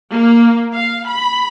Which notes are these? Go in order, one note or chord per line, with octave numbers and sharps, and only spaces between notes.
A#3
F5
B5